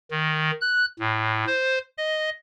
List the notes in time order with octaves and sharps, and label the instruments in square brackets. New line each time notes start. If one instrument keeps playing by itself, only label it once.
[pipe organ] D#3
F#6
A2
C5
D#5